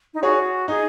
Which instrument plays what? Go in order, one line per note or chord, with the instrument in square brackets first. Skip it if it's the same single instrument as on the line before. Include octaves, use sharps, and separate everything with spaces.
[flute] D#4
[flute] F#4 [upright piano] G#4 C#5
[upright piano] D#4 [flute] G#4